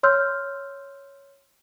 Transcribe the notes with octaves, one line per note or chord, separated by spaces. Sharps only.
C#5 C6 E6 F6 G6